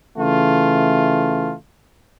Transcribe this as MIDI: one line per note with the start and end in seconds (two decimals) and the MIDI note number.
0.18 1.54 49
0.18 1.54 52
0.18 1.54 57
0.18 1.54 65